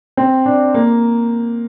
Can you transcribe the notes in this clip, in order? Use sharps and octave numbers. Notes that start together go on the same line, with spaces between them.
C4
D4
A#3